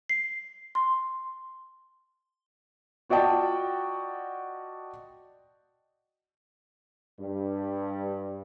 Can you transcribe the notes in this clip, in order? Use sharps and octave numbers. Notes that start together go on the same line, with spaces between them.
C7
C6
F4 F#4 D5 D#5 G5 A5
G2